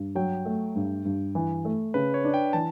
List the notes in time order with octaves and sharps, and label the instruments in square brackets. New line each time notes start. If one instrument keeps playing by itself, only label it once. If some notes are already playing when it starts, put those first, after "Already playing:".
Already playing: [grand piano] G2
[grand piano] F#3 [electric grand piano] G5
[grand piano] A3
G2
G2
E3
A3
[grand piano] C#3 [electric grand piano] B4
[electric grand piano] C#5
[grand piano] D4
[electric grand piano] G5
[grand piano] E3 [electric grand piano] A5